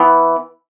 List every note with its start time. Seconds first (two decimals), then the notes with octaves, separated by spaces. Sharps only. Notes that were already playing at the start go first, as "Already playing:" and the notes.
Already playing: E3 B3